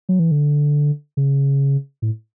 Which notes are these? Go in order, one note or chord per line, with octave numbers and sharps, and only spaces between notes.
F#3
E3
D3
C#3
A2